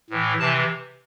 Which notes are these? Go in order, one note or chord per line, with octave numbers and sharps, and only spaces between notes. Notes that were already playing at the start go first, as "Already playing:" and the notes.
A2 E3
C3 E3 A5